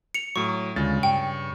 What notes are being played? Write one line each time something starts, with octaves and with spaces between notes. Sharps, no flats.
C#7 F7
A2 F#3 C#6
D2 C#3 G#3 F4 A6
G2 G5 C#6